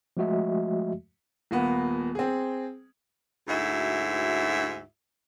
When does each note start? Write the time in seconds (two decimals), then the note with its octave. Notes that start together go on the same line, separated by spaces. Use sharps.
0.17 F3 G#3 A3 F#4 D#5 E5
1.51 D#1 A#3 B3
2.15 C4 G#4
3.48 D2 G#2 E4 F#4 E5